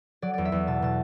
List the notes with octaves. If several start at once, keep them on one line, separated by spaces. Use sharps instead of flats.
F#3 D5
E2 D5
E5
E2
B2 A5
B2 A5